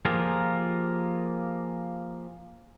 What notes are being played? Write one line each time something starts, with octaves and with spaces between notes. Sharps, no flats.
F3 A#3 F4 G4 G#4 A#4